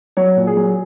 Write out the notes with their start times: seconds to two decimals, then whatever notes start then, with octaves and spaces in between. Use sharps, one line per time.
0.17 F#3 C#5
0.36 A#2
0.47 G#4
0.57 F#3